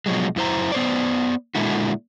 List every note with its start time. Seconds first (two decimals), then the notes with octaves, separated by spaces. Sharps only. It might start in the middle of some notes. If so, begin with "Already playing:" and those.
0.06 B2 F3 F#3 G#3
0.36 F#2 E4 C5 A#5
0.72 B3 C5 D5
1.55 A#2 D3 G#3 E4 F#4